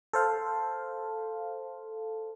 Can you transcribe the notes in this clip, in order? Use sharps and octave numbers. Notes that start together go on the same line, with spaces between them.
A4 C5 F5